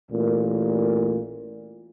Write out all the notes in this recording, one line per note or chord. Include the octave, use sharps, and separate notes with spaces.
A1 A#2